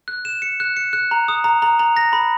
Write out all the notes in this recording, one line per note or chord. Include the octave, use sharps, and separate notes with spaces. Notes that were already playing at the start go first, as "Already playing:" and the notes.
F#6
E7
C#7
F#6
C#7
F#6
A#5
D#6
A#5
A#5
A#5
A#6
B5